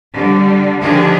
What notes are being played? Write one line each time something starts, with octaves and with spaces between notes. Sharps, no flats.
D3 G3
D3 D#3 F3 D4 G4 G#4